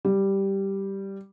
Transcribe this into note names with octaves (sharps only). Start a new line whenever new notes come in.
G3